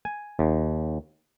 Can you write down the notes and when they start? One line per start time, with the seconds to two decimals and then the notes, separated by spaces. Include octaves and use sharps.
0.05 G#5
0.39 D#2